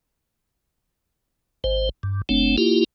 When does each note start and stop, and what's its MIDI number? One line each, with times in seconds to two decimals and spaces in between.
1.64 1.89 32
1.64 1.89 72
2.03 2.22 43
2.29 2.56 30
2.29 2.56 57
2.29 2.56 60
2.29 2.56 62
2.58 2.84 58
2.58 2.84 64
2.58 2.84 65
2.58 2.84 67